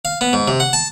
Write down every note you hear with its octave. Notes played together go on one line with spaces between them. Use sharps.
F5
B3
G#2
C3
F#5
A5